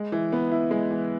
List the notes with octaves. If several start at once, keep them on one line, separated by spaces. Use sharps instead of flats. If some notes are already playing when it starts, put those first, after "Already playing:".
Already playing: G#3
E3
B3
E4
G#3
E3